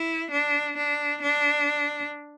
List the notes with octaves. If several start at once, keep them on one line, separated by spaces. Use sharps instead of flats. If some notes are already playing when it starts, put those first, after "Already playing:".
Already playing: E4
D4
D4
D4